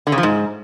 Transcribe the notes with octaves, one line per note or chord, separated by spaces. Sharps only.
D3
C#3
F3
G#2